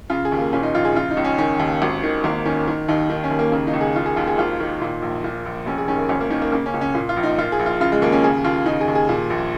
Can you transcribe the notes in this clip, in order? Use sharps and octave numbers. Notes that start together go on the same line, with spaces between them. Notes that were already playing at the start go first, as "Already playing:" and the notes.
C#3 F4
G#4
D#2
A#3
A#2 C#4
D#4
A#1 F4
G#4
C#3 F4
D#4
C#2
C#4
D#3 C#4
D#2
G#1
D#3
G#1 A#3
D#3 C#4
D#3
D#2 D#4
D#3
C#4
D#2
A#3
C#3 A#3
D#4
C#2
G#4
D#3 F4
G#4
D#2 F4
G#4
G#1 F4
D#3 A#3
A#2
A#1
A#2
A#1
F1 C#4
G#4
D#3 C#4
A#3
G#1 C#4
A#3
D#3 C#4
A#3
C#3 A#3
C#4
C#2
C#4
A#2
F4
A#1
D#4
A#2 F4
G#4
A#1
F4
C#3 F4
G#3
D#2 A#3
C#4
C#3 G#4
D#2 F4
C#3 D#4
G#4
D#2
G#4
A#2
A#1